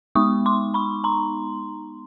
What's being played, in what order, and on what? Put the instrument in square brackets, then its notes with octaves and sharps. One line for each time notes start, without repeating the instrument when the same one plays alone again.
[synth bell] G#3 B3 D#4 C#6 D#6
C6 D6
B5 C#6
A#5 C6